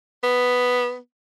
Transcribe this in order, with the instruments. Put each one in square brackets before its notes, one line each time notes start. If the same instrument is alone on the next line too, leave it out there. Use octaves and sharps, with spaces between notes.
[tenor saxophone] B3